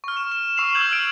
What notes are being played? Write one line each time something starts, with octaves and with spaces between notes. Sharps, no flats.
C#6 F6
E7
E7
C#6 E6 C7 E7 F7
E6 F6 G6 G#6 F#7
E6 F6 D7